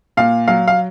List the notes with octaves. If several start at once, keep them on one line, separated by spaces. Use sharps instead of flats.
A#2 F5
F#3 F5
F5